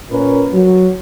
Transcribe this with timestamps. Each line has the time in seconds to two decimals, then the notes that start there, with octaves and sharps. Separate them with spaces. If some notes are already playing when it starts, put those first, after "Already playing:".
0.10 A#2 C#4 A#4 B4
0.53 F#3